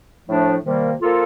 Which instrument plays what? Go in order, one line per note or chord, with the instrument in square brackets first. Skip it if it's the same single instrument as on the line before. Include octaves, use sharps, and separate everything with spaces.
[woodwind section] A2 F3 A3 D4
C3 D#3 G3 A#3
F3 A#3 F4 A4